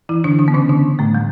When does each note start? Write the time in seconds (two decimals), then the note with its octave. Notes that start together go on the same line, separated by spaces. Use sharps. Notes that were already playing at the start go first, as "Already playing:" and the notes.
0.09 E3 E4
0.24 D3 D4
0.39 D3 D4
0.48 B3
0.54 C#3 C#4
0.69 D3 D4
0.99 A2 A3
1.15 G3